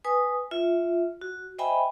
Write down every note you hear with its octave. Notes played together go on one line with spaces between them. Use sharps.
B4 G#5 D#6
F4 E5
F#4
C5 D#5 E5 G5 G#5 B5